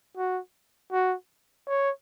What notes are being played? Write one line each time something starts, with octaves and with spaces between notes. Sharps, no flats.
F#4
F#4
C#5